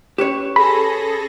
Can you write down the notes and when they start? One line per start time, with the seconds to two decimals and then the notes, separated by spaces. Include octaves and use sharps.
0.18 C#4 G4 B4 C#5
0.56 G#4 A4 B5 A#6